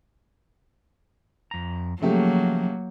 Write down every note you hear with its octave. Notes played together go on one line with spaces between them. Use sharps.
F2 A#5
C#3 F3 F#3 A3 A#3 G4